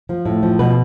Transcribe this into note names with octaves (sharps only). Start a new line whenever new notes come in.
F3
A2
F3
B2 B4